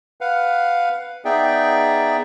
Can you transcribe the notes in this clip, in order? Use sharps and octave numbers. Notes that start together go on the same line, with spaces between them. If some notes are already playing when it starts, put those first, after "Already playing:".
B4 F5 F#5
B3 D#4 G#4 D5 E5 G5